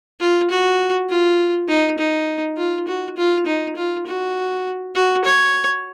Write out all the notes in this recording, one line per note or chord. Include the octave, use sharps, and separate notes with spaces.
F4
F#4
F4
D#4
D#4
F4
F#4
F4
D#4
F4
F#4
F#4
C#5